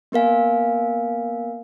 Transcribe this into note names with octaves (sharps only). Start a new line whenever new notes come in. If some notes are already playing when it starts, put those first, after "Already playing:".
A#3 B3 A#4 F5 G#5